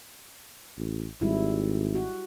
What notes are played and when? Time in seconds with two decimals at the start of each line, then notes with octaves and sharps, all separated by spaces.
0.78 A1
1.21 G#1 G3 E4
1.95 F#4